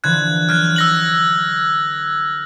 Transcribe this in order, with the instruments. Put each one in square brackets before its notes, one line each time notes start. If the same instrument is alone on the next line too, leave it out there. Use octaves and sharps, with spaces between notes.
[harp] D3 E3 F3 [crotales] F#6 G#6
[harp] F#3 [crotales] F6 F#6 G#6
[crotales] E6 A#6 F#7